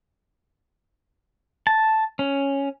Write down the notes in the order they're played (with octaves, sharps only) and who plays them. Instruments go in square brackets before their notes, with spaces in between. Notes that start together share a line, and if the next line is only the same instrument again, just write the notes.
[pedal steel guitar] A5
C#4